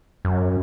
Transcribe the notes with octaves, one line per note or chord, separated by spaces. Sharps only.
F#2